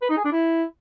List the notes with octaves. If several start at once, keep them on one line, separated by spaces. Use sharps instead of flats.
B4
D#4
G#4
D4
E4